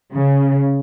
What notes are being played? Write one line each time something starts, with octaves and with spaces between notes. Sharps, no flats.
C#3